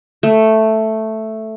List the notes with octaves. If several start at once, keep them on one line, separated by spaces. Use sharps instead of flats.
A3